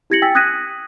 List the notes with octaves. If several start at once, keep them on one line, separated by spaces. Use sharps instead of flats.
E4 G4 G#6 A#6 C#7 F#7
G5 G#5 E6 A6 B6
D#6 F#6 G#6 A#6 B6 D#7